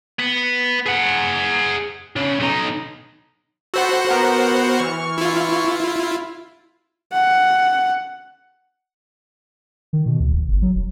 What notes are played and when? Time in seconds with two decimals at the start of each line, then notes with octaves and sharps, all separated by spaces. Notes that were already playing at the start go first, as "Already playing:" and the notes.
0.19 B3
0.86 G#4 F#5
2.16 C#3
2.39 B1 D#4
3.74 F#4 A4 C5 F#5 B5
4.10 B3 A#4
4.77 E3 C#6 F6
5.18 E4 F4
7.13 F#5
9.93 D#3
10.06 B2
10.20 D2
10.32 D1
10.48 G1
10.62 F#3
10.75 E1